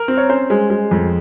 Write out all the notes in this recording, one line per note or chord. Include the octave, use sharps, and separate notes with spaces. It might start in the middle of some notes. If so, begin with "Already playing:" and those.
Already playing: A#4
C4
C#5
C#4 C5
G#3
G#3
F2